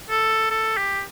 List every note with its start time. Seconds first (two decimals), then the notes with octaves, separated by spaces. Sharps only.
0.10 A4
0.51 A4
0.77 G4